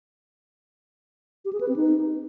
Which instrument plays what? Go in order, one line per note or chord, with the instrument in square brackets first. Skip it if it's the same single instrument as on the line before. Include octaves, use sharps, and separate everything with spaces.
[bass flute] G4
G#4
B4
C4
D#4